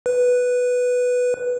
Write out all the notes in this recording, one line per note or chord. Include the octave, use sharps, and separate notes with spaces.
B4